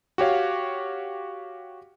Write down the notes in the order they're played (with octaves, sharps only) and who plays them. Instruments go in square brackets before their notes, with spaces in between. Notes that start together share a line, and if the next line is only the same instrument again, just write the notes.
[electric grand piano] F#4 G4 C#5 F5